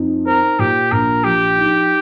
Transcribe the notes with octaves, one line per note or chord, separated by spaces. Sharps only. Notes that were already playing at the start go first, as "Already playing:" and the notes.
Already playing: F2 D#4
A#4 C5
A#2 G4
A#1 A#4
F3 G4
D#4